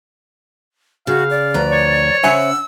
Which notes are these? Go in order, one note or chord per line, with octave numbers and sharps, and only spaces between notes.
C#3 F#4 F5
D5
D2 F3 B4 A#5
C#5
C#3 C#4 C5 E5 F#5 G#5 E6